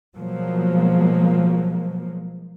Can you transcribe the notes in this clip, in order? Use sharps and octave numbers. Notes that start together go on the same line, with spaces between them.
B2 F3 F#3 G#3 A#3